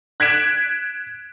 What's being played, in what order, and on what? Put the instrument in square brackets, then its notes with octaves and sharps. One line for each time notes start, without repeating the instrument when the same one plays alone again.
[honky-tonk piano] F#6 G#6 B6 D7 E7